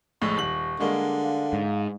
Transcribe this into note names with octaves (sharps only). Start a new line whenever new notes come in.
A#1 A2 G#3 C#6
D#1 F#7
D3 G3 G#3 A#3
F5
G#2